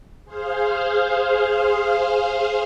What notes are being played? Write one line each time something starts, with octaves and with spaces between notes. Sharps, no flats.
G#4 C5 F5